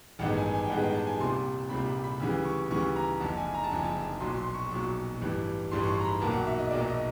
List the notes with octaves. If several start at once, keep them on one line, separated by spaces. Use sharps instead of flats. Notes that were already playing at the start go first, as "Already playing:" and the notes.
A1 G2 D#3 G#3 B3 F#5
G#5
G#5
G5
A1 G2 D#3 G#3 B3 F#5
G5
A5
G#5
C2 A#2 G3 C4 C6
C2 A#2 G3 C4 B5
B5
B5
D2 C#3 E3 G3
C#6
D2 C#3 E3 G3 C#6
A#5
F#1 F2 D3 A5
G#5
A#5
A5
F#1 F2 D3 G#5
A5
B1 A#2 F#3 C6
C6
C#6
B1 A#2 F#3 C#6
A1 G2 E3 G3
A1 G2 E3 G3 C6
C#6
C6
A#5
B5
B1 A#2 F#3 A#3 A5
F#5
E5
D#5
B1 A#2 F#3 A#3 D5
D#5